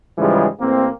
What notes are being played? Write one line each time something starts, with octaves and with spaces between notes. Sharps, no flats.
G#2 C#3 E3 F3 G3 G#3
A1 A#3 C4